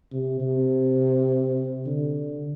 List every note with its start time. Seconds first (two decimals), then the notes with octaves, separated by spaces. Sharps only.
0.12 C3
0.40 C3
1.86 D3